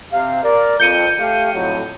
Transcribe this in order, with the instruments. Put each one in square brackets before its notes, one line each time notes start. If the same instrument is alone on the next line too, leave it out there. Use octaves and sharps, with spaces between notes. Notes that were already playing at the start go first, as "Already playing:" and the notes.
[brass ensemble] C3 F5
A#4 D5
[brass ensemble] F2 [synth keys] G6 C#7 D#7
[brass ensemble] A3 G4 F5
F2 A2 F#3